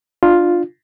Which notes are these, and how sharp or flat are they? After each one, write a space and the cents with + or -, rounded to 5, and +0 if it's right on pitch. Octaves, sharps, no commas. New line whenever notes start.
D4 +30 F4 +5